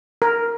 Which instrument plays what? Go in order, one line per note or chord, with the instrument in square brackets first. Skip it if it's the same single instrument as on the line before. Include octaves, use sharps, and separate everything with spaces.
[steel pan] A#4